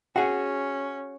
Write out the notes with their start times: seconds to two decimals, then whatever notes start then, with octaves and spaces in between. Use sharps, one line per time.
0.16 C#4 F#4 G#4 F#5